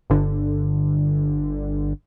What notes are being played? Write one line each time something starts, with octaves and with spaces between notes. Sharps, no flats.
G1 D3